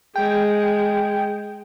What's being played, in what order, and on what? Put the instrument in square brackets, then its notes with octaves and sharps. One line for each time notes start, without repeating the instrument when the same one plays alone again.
[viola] G#3 [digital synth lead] G5